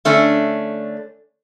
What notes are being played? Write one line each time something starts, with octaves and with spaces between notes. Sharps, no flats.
D3 A3 C#4 D4